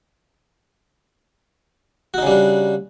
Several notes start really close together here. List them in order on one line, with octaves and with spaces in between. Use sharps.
F#4 D#4 C#3 G3 D4